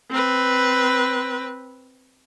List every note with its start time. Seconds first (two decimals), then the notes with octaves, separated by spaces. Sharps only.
0.11 C4 B4